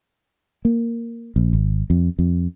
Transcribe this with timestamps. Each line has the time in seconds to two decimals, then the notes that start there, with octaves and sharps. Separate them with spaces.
0.65 A#3
1.36 A#1
1.53 G#1
1.90 F2
2.19 F2